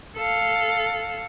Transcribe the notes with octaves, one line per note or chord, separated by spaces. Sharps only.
A4 F5